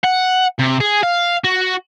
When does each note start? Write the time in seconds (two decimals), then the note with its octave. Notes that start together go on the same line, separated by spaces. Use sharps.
0.04 F#5
0.59 C3
0.80 G#4
1.03 F5
1.44 F#4